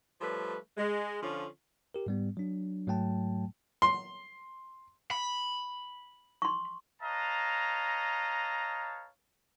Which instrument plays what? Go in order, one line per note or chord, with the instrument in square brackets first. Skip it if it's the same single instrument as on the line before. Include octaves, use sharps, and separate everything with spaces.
[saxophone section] F3 G3 A3 B4 C#5
G#3
D3 F3 C#4 F4
[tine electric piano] G4 A#4
G#2 G3 B3
F#3 D4
G#2 F#3 A3 G5 A5
[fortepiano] C6
[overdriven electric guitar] B5
[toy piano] C6 C#6
[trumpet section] B4 C#5 D#5 F5 A5 A#5